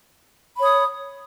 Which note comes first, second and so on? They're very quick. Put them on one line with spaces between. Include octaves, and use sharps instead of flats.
B5 C#5 D#6